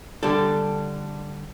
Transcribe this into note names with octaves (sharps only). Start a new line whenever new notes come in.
D3 G3 D4 A4